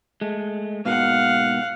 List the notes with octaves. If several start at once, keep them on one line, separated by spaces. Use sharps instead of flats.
G#3 A3
G#2 B2 A#3 F5 F#5